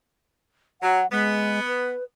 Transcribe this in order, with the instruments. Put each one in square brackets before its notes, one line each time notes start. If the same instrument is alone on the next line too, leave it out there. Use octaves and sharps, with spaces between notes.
[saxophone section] F#3 [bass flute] F#5
[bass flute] G#3 [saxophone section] B3
[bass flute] B4